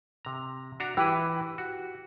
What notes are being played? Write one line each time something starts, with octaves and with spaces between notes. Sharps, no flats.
C3 A#5
D4 F#4 A#5
E3 E4 G4 B4
F#4